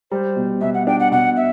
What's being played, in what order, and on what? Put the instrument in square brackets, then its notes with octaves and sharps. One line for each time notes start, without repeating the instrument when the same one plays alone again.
[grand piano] G3 [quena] C5
[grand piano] B2
[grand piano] B2 [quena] E5
[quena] F#5
[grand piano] D4 [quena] G5
[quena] F#5
[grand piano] B2 [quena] F#5
[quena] E5